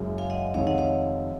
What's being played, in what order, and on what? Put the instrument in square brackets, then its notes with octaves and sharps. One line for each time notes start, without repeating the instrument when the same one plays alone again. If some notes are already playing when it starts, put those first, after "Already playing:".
Already playing: [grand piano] F#1 F#2 C#3 G#3
[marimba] F5 G#5
D#5 F#5
[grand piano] F1 F2 D#3 G#3 D#4 [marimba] C#5 F5
[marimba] D#5 F#5
C#5 F5